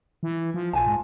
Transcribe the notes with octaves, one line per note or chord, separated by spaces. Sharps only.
E3
F3
B1 F4 G#5 A5
G#2